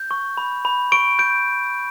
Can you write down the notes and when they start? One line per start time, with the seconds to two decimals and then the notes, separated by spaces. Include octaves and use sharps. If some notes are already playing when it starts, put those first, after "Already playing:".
Already playing: G6
0.11 C#6
0.37 B5
0.65 B5
0.92 C#6 D7
1.19 G6 D7